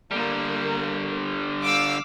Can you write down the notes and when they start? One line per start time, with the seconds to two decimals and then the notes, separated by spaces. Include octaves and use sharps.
0.11 D3 G3 A#3
1.63 F5 D6 E6